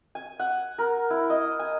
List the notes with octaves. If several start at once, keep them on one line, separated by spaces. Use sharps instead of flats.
G#5
F#5
A#4
E4
D#5
G#5